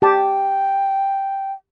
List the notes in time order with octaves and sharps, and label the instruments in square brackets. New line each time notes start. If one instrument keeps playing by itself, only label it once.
[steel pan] G4 A5 [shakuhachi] G5